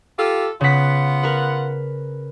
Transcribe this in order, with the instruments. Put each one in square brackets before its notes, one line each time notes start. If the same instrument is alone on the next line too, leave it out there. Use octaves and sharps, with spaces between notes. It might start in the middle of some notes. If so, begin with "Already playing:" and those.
[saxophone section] F4 G4 A4
[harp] C#3 B6 [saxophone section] B3 F4 F#5
[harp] A#4 B4